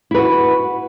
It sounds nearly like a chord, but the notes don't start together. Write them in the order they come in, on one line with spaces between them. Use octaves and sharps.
E4 B4 F#4